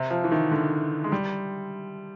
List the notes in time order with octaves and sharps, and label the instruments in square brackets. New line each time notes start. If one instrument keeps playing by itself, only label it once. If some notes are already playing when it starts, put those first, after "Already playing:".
Already playing: [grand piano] C3
F3
E3
D#3
D3
G#3
G3